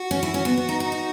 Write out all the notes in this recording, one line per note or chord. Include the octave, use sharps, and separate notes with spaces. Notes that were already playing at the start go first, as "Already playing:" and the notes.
Already playing: F#4
C#4
E4
C#4
B3
B3
D#4
D#4
D#4